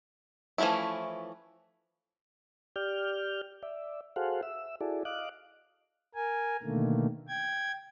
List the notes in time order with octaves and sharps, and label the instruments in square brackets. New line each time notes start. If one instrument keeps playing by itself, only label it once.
[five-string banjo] E3 F3 A3 C#4 E4
[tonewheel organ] G4 D5 F6 G6
D5 E5
F#4 G#4 A4 C5 F5 F#5
E5 E6
E4 F#4 G#4 A4 D5
D#5 F5 D6 F#6
[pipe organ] A#4 G#5
B2 D3 D#3 A3 A#3
G5 G#6